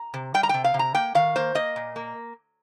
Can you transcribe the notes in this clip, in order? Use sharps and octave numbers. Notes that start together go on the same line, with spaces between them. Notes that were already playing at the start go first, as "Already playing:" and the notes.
Already playing: A#5
C3
G3 G5
A#5
C3 G5
F5
C3
A#5
A#3 G5
D#3 F5
A#3 C5
A#3 D#5
A#2
A#3